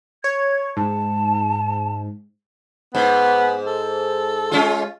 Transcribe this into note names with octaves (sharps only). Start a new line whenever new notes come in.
C#5 G#6
G#2 A5
G#2 B3
A4
G#3 C#4 F4